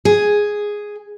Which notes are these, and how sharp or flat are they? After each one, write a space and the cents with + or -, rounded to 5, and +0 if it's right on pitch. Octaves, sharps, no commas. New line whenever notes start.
G#4 +0